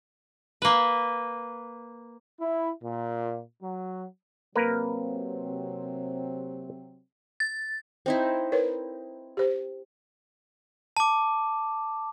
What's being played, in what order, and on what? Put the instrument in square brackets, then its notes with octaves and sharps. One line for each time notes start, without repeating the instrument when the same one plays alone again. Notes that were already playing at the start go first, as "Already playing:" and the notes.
[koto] A#3 B4
[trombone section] E4
A#2
F#3
[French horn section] C3 F#3 C4 [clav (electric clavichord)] A#3 A#4 B4
[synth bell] A6
[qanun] C4 D#4 E4
[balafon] A#4 B4 C#5
G4 C5
[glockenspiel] A5 D6